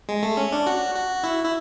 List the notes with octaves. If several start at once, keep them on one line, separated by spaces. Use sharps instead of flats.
G#3
A3
C#4
D4
F#4
F#4
E4
E4